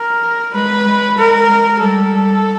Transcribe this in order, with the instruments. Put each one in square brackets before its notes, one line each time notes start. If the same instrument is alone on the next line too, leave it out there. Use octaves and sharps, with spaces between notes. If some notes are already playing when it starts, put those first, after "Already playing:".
Already playing: [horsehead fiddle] A#4
[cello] G#3 [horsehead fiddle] B4
[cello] G#3
[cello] G#3 [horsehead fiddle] A#4
[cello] G#3
[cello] G3 [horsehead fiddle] A4
[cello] G3